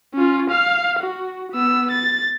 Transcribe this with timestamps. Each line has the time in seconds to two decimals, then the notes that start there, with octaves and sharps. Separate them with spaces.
0.14 C#4 F4
0.50 F5 F6
0.99 F#4
1.52 B3 E6
1.91 A6